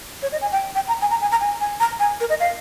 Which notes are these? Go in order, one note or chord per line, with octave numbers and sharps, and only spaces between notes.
C#5
D#5
G#5
G5
G5
A#5
G#5
A#5
G#5
A#5
G#5
G#5
A#5
G#5
A#4
D#5
F5